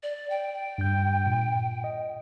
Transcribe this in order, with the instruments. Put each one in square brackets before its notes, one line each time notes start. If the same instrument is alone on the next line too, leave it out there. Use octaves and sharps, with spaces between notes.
[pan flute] D5
G5
[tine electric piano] G2 G6
A#2
D#5